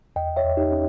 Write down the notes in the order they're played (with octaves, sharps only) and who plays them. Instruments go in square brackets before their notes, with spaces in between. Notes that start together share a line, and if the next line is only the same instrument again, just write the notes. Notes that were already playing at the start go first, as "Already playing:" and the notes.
[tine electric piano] E2 D#5 G5
C#5 E5
E2
D#4 G4
C#4